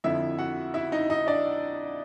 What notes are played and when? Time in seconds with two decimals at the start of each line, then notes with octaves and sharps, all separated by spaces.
0.04 F2 D3 F3 E4 E5
0.38 F#4 F#5
0.74 E4 E5
0.92 D#4 D#5
1.10 D#4 D#5
1.27 D4 D5